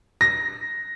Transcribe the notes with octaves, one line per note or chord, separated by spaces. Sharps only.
A#6